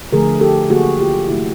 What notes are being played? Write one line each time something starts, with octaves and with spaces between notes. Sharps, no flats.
D3 F3 A3 G#4 A#4
G4 A4
D3 F#3 A#3 F#4 G#4
F4 G4
C3 F3 A3 E4 F#4